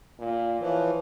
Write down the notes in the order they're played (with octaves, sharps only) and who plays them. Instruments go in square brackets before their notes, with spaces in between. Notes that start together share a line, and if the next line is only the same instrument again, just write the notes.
[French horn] A#2
[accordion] E3 F3 [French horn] C#5